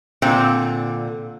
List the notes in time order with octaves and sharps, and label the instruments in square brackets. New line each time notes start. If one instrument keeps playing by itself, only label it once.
[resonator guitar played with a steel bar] A#2 D3 C4